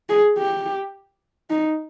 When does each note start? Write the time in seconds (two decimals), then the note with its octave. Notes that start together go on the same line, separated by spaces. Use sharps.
0.09 G#4
0.38 G4
1.50 D#4